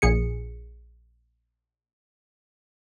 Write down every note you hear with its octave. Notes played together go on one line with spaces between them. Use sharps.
A#1 G#4 C#7